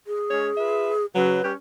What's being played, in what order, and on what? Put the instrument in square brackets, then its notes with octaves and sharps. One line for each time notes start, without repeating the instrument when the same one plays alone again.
[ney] G#4
[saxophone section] G#3 C#4 C#5
F4 B4 E5
[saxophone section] C#3 F#3 [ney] B4
[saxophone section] G3 C#4 G4